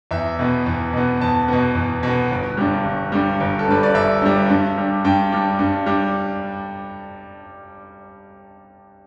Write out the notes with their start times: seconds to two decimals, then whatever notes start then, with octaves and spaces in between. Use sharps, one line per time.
0.11 E2 E5
0.39 B2 B3
0.66 E2
0.93 B2 B3
1.21 E2 A5
1.48 B2 B3
1.75 E2
2.03 B2 B3
2.31 G1
2.57 G2 G3
2.85 G1
3.12 G2 G3
3.40 G1
3.59 A4
3.67 G2 G3 B4
3.83 D5
3.94 G1 E5
4.22 G2 G3
4.50 G2
4.78 G3 D4
5.05 G2 G5
5.32 G3 D4
5.59 G2
5.86 G3 D4